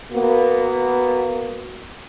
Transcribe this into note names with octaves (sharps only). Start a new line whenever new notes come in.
A#3 B3 F#4